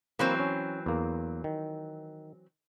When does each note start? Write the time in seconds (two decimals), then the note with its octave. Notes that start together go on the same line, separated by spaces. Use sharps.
0.19 E3 F#3 A#3 C4 C5
0.40 C#4
0.86 E2 A#3
1.44 D#3